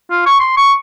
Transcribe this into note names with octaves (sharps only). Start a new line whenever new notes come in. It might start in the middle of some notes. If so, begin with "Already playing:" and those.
F4
C#6
C6
C#6